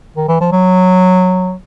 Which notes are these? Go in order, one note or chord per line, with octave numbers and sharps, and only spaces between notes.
D#3
E3
F3
F#3